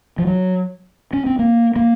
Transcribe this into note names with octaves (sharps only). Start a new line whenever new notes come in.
F3
F#3
C#4
C4
A#3
A#3